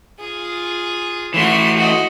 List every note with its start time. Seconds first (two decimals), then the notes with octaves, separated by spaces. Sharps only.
0.20 F4 G#4
1.34 E3 A3 F#4 C6
1.77 F#4 D#5